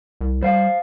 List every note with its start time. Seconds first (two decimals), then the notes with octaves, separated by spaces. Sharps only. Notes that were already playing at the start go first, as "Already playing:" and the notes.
0.21 C2
0.42 G3 C5 F5